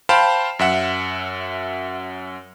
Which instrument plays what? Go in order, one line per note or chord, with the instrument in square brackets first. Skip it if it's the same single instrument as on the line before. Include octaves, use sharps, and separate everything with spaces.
[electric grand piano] C5 F5 G5 A5 B5
F#2 E5 F#5